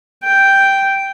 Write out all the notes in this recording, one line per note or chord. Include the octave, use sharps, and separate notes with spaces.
G5